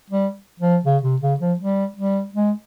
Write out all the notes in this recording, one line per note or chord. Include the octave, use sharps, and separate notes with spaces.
G3
F3
C#3
C3
C#3
F3
G3
G3
G#3